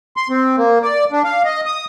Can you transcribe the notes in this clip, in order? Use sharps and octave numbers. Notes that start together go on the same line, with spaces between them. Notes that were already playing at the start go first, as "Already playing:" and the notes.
C6
C4
A#3
D5
D4
F5
D#5
D#6